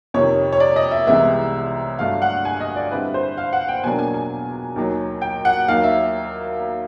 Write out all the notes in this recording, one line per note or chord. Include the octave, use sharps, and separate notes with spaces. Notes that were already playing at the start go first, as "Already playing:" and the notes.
F2 C3 D#3 C#5
C#5
D5
D#5
E5
C2 C3 E3 G#3 B3 E5
G2 D3 F#3 A3 D4 F5
F#5
G#5
D#5
D5
D3 G3 C4 E4 B4
C5
F5
F#5
G5
E2 B2 F#3 A#3 D4 G#5
G#5
G#5
D#2 D#3 F#3
G5
F#5
D#2 D#3 F#3 F5
E5